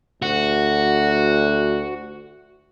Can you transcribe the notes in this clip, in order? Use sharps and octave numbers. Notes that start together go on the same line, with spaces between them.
D2 F#4